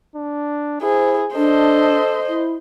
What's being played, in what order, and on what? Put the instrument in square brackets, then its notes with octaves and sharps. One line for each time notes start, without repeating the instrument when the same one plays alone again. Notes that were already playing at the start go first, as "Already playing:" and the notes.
[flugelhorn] D4
[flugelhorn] E4 [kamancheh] G#4 [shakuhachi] C5
[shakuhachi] D4 [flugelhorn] A4 [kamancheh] C5 D#5
[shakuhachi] E4